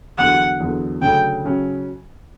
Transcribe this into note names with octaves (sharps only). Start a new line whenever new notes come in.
E2 D3 F#3 F#5
E2 D3 F#3
D2 C#3 F#3 C#4 G5
C#3 F#3 C#4